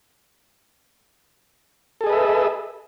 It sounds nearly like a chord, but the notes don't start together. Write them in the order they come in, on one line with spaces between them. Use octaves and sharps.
A4 G#4 D#5 B4 E5